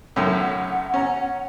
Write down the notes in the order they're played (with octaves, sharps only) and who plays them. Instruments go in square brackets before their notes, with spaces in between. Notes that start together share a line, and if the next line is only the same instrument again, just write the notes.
[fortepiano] B1 F#2 A2 [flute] A#4
[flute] F#5
[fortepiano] C#4 A#5